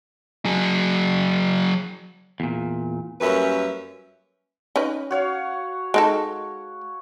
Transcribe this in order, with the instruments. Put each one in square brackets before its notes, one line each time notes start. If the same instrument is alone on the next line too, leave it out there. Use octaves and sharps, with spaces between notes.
[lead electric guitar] F#3 G#4
[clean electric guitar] E2 A#2
[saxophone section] F#2 G3 A#3 C#4 B4 E5
[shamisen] C#4 D#4 B4
[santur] F#4 C#5 F5
[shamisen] G#3 D#4 A4